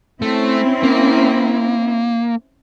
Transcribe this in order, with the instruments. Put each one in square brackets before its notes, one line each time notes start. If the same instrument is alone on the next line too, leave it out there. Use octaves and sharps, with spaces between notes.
[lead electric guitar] A3 [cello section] C4 C#4 E4
[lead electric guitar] A#3